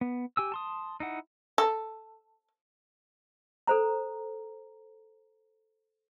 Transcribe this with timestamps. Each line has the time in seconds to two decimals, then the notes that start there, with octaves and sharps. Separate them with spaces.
0.01 B3
0.37 G4 G#5 E6
0.52 A5 C6 D#6
1.00 D#4 E4 F#5
1.58 A4
3.67 A4 C5 A#5